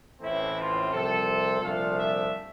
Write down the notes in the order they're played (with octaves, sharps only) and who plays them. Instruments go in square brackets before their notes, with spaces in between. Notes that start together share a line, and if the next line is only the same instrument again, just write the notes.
[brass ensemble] A1 A2 E3 A3 C4 E4
F4
C2 C3 F3 C4 A4
C2 A#2 F3 A3 D4 F5
E5